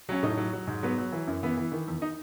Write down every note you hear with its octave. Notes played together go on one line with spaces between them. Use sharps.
F#3 C#4
A2 D#4
F#3
F#3
G#2
F#3 B3
F#3
E3
F#2
E3 B3
E3
D#3
E2
D#4